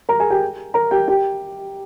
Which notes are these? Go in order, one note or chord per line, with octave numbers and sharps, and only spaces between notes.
A#4 A#5
G#4 G#5
G4 G5
A#4 A#5
G4 G5
G4 G5